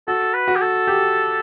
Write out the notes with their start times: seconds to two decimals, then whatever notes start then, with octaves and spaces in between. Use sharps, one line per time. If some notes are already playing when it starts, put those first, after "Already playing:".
0.08 F#4 A4
0.34 B4
0.48 F#4
0.55 G4
0.61 A4
0.87 G4